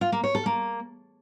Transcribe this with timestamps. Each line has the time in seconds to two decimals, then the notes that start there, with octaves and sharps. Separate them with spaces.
0.01 F4
0.12 A#3
0.24 C#5
0.35 A4
0.46 A#3